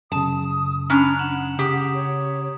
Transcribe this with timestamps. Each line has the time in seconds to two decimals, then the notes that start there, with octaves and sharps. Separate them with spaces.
0.12 F#2 C#3 A5 D#6
0.90 C#4 D4 A#5 B5 F7
1.19 F#5 E7 F#7
1.59 C#3 G4 D#6
1.94 C#5